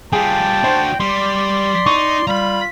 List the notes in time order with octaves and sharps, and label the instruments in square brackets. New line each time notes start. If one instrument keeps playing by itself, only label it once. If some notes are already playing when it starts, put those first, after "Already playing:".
[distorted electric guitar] G3 F4 [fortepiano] G#4 [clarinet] G5 [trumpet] A5
[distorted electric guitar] D4 F#4 [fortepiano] C5
[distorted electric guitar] G3 [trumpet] D5 [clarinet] C6
[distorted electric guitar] D#4 [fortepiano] C#6
[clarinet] G3 [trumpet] F4 [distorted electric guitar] A#5 B5